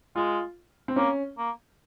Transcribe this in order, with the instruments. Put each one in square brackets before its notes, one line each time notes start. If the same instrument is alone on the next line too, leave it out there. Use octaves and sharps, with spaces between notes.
[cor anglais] G#3 [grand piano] F4
[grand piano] C4
[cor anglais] A#3 [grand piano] C#4
[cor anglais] A#3